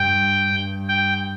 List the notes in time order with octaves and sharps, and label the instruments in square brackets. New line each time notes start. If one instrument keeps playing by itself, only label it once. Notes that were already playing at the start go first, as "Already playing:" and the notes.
Already playing: [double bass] G2 [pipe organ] G5
[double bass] G2
[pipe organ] G5